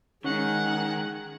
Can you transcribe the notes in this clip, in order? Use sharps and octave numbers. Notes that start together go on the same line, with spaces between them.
D#3 G#3 C#4 F#5 G#5